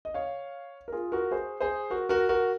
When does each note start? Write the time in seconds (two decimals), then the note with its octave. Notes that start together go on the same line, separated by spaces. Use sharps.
0.05 D#5
0.14 C#5 F5
0.88 A#4
0.92 F4 G#4
1.12 F#4 A#4
1.31 G#4 C5
1.60 G#4 C5
1.90 F#4 A#4
2.09 F#4 A#4
2.29 F#4 A#4